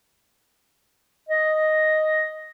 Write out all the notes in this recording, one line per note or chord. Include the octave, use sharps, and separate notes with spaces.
D#5